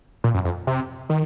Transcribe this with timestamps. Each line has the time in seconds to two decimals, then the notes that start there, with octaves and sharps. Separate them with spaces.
0.24 A#2
0.34 F#2
0.45 F2
0.67 C3
1.10 D#3